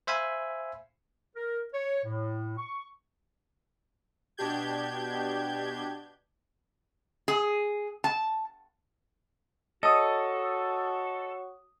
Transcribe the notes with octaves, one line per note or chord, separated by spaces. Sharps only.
C5 E5 F5 G#5 B5
A#4
C#5
A2
C#6
B2 D4 G4 G6 G#6
G#4
A5
F#4 A4 C#5 D#5 D#6